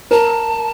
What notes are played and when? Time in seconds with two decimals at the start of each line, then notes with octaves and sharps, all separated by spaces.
0.11 A#4 A5